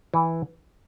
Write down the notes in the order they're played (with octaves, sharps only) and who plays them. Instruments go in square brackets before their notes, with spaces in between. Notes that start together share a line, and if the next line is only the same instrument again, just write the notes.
[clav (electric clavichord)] E3